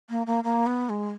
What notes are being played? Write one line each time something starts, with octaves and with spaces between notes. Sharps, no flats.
A#3
A#3
A#3
B3
G#3